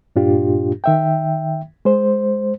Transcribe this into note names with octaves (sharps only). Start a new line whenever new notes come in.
G2 A#2 D4 F4 G4
D#3 E5 G5
G#3 C5